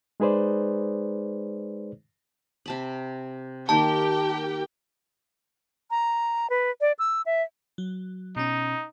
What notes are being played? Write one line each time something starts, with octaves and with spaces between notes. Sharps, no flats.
G#3 D#4 G#4 B4 C5 D5
C3 A5 B5
D#3 A#3 G4 A#4 G5 A5
A#5
B4
D5
E6
E5
F#3
B2 C#4 D#4